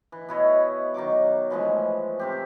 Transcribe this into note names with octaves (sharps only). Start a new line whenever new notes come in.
E3
B2 E4 C#5 D#5
D#3 F#3 C#6 D6
E3 F3 G#3 A3
C3 C4 G4